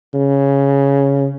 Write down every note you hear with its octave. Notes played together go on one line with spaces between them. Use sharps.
C#3